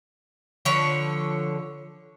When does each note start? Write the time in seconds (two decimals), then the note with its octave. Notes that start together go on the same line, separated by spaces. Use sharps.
0.65 D3 F3 B4 C#5